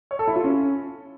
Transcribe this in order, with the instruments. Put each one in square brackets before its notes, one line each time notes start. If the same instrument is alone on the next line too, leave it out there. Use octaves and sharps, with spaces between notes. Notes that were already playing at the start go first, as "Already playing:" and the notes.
[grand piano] C#5
A4
E4
F4
C#4